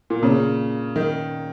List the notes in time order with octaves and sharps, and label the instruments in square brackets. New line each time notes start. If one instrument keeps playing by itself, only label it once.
[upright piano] A#2
[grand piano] A#2 A#3 C#4 [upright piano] C#3
[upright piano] D#3